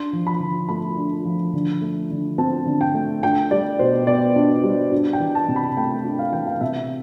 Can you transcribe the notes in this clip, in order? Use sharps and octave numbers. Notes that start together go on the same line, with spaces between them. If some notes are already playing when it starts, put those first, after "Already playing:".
Already playing: D4 C6
F3
B5
D3
A3 B5
D4
F3
D3
A3
D3
C4 A5
D3
G5
A3
D4 G5
G3 D5
B2 C5
B3 D5
D4
G3
D4
G5
E3
A5
C3
B5
A3 G5
D4
F5
E3 G5
F5
C3 E5